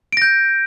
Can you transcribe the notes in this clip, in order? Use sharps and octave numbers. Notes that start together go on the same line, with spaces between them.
G6 A#6 D7